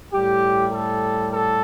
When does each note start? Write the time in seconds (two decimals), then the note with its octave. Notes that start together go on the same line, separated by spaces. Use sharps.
0.12 A2 G3 G4
0.72 A4
1.33 A4